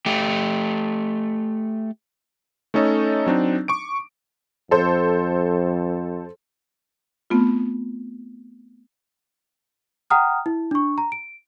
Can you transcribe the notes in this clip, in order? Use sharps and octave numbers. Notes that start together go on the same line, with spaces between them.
A3 G4
A3 C#4 D#4 A4 C#5 D#5
F#3 C4 D4 D#4
C#6 D6 D7
F2 A4 C5
A3 B3 C4 F4
F#5 G5 A#5 D#6 F6
E4
D4 C#6
A#5
D7